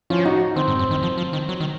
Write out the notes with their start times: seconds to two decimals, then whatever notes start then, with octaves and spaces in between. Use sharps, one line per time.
0.10 F3 C#4 F4
0.25 D#4 F#4
0.56 D#3 C4
0.68 G#2
0.79 F#2
0.91 D#3
1.03 F3
1.18 F3
1.33 D#3
1.49 F#3
1.60 D#3